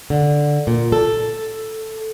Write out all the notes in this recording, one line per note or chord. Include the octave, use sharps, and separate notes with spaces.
D3
A#2
A4